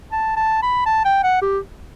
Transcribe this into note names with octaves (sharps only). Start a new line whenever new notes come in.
A5
A5
B5
A5
G5
F#5
G4